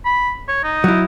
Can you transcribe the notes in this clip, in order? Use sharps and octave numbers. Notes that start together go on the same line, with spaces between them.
B5
C#5
D#4
F#3 E4